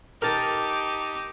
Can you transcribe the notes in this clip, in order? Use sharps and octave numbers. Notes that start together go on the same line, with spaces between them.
D#4 G4 A#4 A5